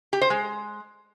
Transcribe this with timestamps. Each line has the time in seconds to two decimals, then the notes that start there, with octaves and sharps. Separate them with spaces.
0.13 G4
0.21 C5
0.30 G#3